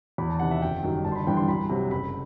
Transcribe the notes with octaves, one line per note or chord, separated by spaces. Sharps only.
E2 B5
A5
C3 D#3 F#5
E5
F#1 G5
F#2 D#3 G3
G1 A5
C6
B5
G2 E3 G3 G5
C6
C2 B5
C3 F#3
F#1 B5